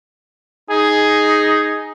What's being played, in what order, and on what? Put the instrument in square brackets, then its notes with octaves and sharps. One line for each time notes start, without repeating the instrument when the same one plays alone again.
[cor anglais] D#4 [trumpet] G#4